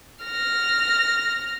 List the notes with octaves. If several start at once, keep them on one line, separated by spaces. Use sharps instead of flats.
F6 A#6